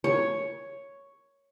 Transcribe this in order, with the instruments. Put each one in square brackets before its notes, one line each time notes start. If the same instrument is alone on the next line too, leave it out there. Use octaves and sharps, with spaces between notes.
[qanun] C#5